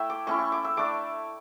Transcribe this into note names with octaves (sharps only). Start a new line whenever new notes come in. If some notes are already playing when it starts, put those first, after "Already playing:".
Already playing: A3 E4 G5 E6
D6
A3 C#4 E4 C#6
C#6
D6
E6
A3 D4 D6